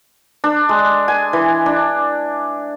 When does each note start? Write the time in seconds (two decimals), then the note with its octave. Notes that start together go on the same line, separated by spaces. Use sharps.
0.44 D4
0.69 G#3
1.08 G#5
1.33 E3
1.66 D4